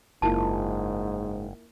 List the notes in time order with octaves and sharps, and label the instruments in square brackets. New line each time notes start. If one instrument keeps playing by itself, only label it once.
[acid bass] F#1 [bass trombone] G#2 [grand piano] A#3 E4 F4 [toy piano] A5